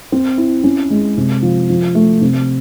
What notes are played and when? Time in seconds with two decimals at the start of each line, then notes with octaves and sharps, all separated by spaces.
0.12 C4
0.38 E4
0.64 C#4
0.90 G#3
1.17 C3
1.42 F3
1.69 F3
1.95 A3
2.21 C3